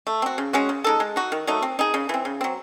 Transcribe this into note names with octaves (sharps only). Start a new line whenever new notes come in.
A3
C4 F#4
C#3
G#3 C#4 F#4
C#3
G#3 D#4 A4
G#3
D#4 F#4
D#3
F#3 A3 D#4
C4
D#4 G#4
C#3
E3 C4
C#3
F#3 C4